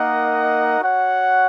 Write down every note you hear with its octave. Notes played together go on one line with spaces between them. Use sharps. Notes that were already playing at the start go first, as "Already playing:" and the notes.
Already playing: A#3 D#4 A#4 D#5 F#5
F#4 C#5 F#5